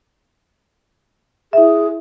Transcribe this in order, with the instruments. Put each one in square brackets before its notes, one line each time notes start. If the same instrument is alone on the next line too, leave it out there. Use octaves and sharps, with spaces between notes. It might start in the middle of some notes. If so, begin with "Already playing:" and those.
[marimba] E4 E5 [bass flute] G#4